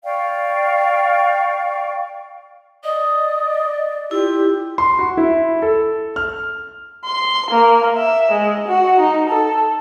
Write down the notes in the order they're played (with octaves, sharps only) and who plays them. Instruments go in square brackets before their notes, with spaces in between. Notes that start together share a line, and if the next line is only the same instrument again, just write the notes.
[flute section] D5 F5 G5 C#6
[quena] D5 [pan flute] D#5 [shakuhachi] D#6
[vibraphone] E4 [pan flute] F4 [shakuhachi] G4
[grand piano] C6
F#4
E4
A4
F6
[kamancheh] C6
A#3
E5
G#3
F#4
D#4
A4